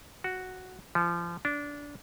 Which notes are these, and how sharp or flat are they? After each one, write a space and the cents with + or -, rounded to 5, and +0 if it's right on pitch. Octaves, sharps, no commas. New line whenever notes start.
F#4 +0
F3 -30
D4 -20